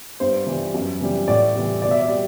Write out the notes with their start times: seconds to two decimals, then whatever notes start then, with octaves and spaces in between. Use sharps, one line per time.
0.20 G2 C5
0.47 E3 G3
0.74 F#2
1.01 E3 G3
1.28 A2 D5
1.55 E3 G3
1.82 B2 D5
1.91 E5
2.01 D5
2.09 G3